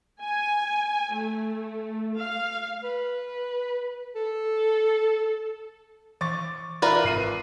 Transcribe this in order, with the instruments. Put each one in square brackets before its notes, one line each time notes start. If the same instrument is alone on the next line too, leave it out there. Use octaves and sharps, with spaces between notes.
[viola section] G#5
A3
F5
[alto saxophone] B4
A4
[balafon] E3 [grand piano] C#6 D6 A6
[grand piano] F4 E5 F#6 [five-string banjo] A#4 B4 D5
[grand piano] G#1 C7 D#7